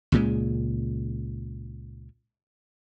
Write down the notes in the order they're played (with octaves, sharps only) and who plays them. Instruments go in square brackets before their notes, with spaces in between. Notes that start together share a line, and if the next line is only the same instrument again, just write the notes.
[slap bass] C#2 A#2 C#3 G#3